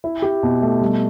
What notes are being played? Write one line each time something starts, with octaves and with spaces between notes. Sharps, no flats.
E4
G4
B2
A3
G3